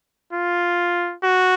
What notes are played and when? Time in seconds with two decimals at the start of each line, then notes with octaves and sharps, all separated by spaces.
0.33 F4
1.24 F#4